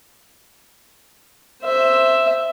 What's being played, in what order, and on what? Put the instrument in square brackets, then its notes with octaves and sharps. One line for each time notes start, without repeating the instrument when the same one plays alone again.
[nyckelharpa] C5 E5